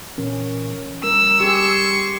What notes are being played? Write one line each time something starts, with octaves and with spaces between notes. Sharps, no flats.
A#2 E3 C#4 A#4
G3 A#4 E6
G4 G#4 G#5 C6 C#6